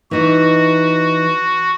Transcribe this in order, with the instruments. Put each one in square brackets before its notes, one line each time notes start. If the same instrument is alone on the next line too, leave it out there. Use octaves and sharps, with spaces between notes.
[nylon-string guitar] E3 D#4 [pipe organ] F#4